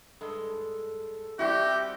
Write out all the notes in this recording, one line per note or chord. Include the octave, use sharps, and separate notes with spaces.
G2 G#3 A4
G3 C4 E4 F#4 G4